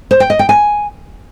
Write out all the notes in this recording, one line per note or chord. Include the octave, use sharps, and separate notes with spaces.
C5
G5
D#5
G5
G#5